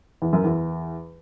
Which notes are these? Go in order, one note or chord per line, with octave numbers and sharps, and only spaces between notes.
E2
F#2
E2